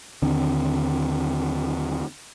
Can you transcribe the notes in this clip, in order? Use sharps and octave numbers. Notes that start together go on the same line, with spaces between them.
D#2 D3 C4